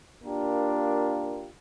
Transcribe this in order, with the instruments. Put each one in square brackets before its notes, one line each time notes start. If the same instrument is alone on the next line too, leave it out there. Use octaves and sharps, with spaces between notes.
[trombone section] A#3 D4 F4 G4 A#4